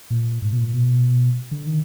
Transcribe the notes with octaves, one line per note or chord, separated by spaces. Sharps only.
A#2
G#2
B2
A#2
B2
D3
D#3